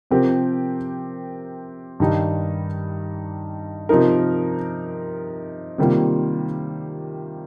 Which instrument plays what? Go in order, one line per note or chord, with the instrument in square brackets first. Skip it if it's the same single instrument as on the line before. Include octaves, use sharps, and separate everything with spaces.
[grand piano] C3 F3 C4 G4 A#4
G2 D#3 G3 D#4
C3 F3 D#4 A#4
C3 D#3 G3 A#3 F4